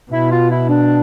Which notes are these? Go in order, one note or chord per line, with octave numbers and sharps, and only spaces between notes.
B2 E4
F4
E4
D4